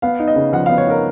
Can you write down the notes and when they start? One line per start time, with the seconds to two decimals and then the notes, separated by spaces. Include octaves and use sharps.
0.02 B3 F5
0.20 D#4
0.28 D#5
0.36 C#3
0.53 F3 F#5
0.66 B3 F5
0.78 C#5
0.87 D#4 A#4